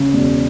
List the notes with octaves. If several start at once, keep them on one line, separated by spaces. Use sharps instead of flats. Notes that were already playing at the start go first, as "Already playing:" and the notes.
Already playing: C#3
E1